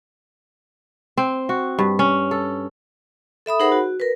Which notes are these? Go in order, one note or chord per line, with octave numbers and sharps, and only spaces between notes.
C4
F#4
G2
C#4
A4
A4 E5 B5 D#6
D#4 G#4 A#4 C5 F#5 B5
F#4
A#4 B4